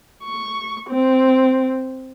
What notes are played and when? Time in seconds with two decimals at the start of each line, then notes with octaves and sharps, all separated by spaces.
0.24 C#6
0.89 C4